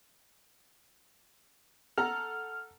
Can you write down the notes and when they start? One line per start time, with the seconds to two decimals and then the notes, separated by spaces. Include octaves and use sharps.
1.98 A4 F#5 A#5 F6